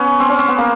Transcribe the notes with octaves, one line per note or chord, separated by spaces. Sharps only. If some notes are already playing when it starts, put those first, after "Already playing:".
Already playing: B3 C#4
C4
C#4
C4
B3
A#3